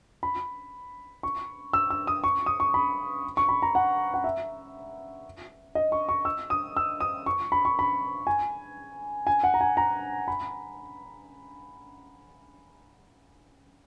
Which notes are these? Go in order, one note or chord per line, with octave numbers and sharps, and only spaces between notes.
B5
C#6
E6
E6
D#6
C#6
D#6
C#6
B5
C#6
B5
A#5
F#5
F#5
E5
D#5
C#6
C#6
E6
D#6
E6
D#6
C#6
B5
C#6
B5
G#5
G#5
F#5
A#5
G#5
A#5
B5